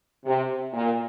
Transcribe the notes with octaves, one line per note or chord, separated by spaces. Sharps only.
C3
A#2